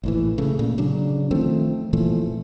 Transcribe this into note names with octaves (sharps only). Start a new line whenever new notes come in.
A#1 A2 E3
C#3 A3
A#2
C#3 F#3 D4
D#3 F3 A3 C4
A#2 E3 F3 A3